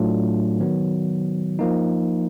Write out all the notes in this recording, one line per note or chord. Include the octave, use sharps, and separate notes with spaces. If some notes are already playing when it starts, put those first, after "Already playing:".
Already playing: A2 F#3 A3 D4 F4
D#3 F#3 B3
F3 A#3 D#4